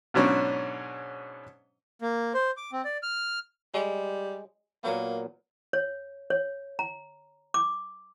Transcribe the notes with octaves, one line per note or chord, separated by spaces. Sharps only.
G#2 B2 F#3 C#4 D4
A#3
C5
D6
C4
D5
F6
G3 G#3
A#2 F#3 A#3 B3
C#5
C#5
A#5
D6